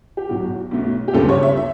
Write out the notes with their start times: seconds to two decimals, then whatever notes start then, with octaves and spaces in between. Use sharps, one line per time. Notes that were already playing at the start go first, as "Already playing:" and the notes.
0.17 G4
0.29 B1 A2 F#3 F#4
0.71 B1 B2 A3
1.08 G4
1.14 D2 C#3 G3 B3 A4
1.29 C#5
1.43 E5
1.57 E5